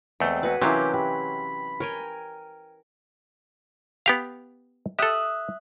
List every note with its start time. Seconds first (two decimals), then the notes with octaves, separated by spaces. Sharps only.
0.20 E2 G#3 A3 C4
0.43 F#4 G#4 B4
0.62 C3 E3 F#3 C#4 G4 A#4 F5
0.94 G4 B5
1.80 A#4 C#5 G5 G#5
4.06 B3 G4 F5
4.99 G4 A4 E5 D#6 F#6